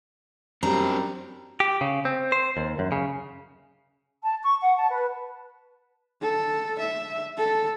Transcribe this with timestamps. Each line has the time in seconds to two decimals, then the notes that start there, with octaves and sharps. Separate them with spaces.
0.63 F#2 G3 C4 D4 A#5
1.60 G4
1.81 C#3
2.05 C4
2.32 C5
2.57 D#2
2.79 F#2
2.92 C#3
4.23 A5
4.43 C#6
4.61 F#5
4.77 A5
4.91 B4
6.21 A4
6.78 E5
7.37 A4